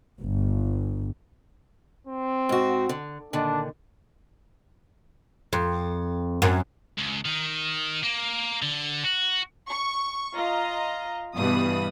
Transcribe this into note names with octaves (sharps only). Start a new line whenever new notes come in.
G1
C4
G#2 F#4
D3
A#2 D3 D#3 D4
F2
F#2
C#2
D#3
A#3
D3
F#4
C#6
F4 D#5 A#5
G2 B2 E3 G3 B4 D#6